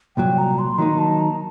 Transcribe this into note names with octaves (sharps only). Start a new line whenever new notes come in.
C2 A#2 F#3 G5
A#5
C6
D#3 F#3 A#3 D#4 A#5
A5
A#5